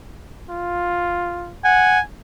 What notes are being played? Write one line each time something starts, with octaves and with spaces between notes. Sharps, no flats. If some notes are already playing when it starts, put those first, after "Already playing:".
F4
F#5 G#5